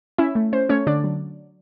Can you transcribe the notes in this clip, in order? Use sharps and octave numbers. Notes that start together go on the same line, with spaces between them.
C#4 E4 E5
A3
C#4 C5
A3 C#4 C#5
D3 D4 D5
F#3